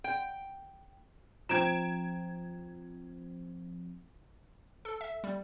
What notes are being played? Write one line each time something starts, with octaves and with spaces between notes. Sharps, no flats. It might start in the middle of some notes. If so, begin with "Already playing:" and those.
G5
F3 C4 G5 A#5 G#6 D7 E7
A4
E5
G3